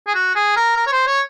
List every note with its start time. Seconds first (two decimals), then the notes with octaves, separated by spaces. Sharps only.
0.07 G#4
0.15 F#4
0.35 G#4
0.56 A#4
0.76 A#4
0.87 C#5
0.92 C5
1.07 C#5